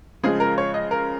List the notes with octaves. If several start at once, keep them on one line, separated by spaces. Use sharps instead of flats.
C#3 F3 G#3 G#4
A#4
C#5
D#5
A#4